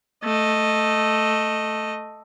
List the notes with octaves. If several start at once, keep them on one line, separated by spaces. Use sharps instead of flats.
A3 D#5